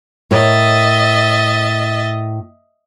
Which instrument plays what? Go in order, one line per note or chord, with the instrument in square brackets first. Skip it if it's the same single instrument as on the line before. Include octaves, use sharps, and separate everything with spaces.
[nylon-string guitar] A2 A#4 C#5 [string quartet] D#5 E5 A6